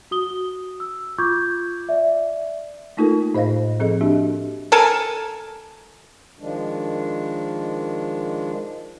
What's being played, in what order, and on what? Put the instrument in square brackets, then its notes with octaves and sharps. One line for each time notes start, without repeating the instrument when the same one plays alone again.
[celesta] F#4 D#6 G7
E6
F4 C#6 D6 G6 G#6
D5 E5
[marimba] A3 A#3 D#4 F4 A4 A#4
A2 C5 D#5 F5 A#6
F3 C4 G#4 A4 D#5
A#3 D4 F#4 G4 E5
[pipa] A4 A#4 G#5 A5
[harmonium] D#3 F3 G#3 D4